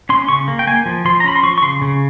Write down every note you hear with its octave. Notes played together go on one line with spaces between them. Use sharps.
C#4 C6
C#3 C#6
A#3
G5
A#3 G#5
F3
F3 C6
A#5
C#4 B5
C6
F3 C#6
C#6
C#3 C6
C#3